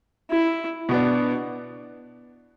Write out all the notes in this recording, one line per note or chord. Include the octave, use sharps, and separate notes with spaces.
E4
B2 B3 D4